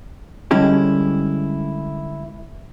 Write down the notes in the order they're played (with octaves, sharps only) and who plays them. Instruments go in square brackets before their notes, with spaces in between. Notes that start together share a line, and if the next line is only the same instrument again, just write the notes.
[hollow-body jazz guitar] D3 G3 G#3 C#4 E4 G4